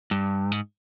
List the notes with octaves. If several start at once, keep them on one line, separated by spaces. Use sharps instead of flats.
G2
G#2